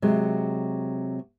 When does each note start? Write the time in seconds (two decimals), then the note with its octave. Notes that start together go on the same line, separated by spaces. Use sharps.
0.02 C3 F#3 G#3